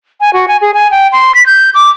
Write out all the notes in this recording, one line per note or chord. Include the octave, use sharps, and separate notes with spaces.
G#5
F#4
G#5
G#4
G#5
G5
C6
B6
G6
D6